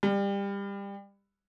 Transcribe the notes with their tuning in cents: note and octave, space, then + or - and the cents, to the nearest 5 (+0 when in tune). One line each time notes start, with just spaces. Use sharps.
G3 +25